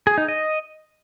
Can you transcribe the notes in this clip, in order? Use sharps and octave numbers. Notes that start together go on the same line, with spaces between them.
G#4
D#4
D#5